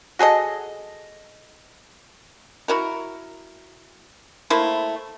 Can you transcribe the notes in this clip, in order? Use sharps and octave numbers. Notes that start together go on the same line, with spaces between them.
F#4 G#4 A4 D#5
E4 F#4 A#4
A3 A#3 E4 C5